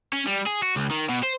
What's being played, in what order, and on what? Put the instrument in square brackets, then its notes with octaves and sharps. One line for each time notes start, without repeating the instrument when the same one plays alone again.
[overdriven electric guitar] C#4
G3
G#4
F#4
C#2
D#3
B2
C5